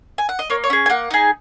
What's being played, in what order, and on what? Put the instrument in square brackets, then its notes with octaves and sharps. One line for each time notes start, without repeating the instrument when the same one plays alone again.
[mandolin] G#5
F#5
D#5
A#3 C#5
C#5
C#4 G#4
G#5
A#3 F#5
D#4 G#4